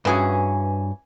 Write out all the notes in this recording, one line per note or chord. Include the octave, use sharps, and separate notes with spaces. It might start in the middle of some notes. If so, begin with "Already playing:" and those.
G2 E3 C#4 F#4 G#4